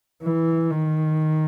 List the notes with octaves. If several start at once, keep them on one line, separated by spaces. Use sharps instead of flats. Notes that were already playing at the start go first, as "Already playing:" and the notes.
E3
D#3